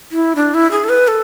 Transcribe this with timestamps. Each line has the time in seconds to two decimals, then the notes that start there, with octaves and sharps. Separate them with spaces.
0.12 E4
0.36 D4
0.54 E4
0.71 G#4
0.84 A4
0.89 B4
1.08 A4